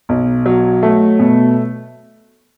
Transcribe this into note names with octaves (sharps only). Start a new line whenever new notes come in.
B1
F#3
A3
B2